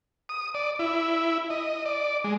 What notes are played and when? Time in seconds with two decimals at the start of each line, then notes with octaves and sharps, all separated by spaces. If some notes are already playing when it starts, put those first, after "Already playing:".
0.29 D#6
0.55 D5
0.79 E4
1.50 D#5
1.85 D5
2.24 G#3